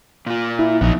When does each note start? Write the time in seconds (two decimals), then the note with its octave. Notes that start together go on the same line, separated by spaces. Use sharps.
0.26 A#2 F4
0.59 E4
0.81 A#1 B3 D#4